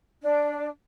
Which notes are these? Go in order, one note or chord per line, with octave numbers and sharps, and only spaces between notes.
D4